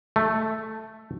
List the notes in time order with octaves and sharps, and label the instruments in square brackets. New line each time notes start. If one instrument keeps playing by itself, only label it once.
[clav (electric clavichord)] A3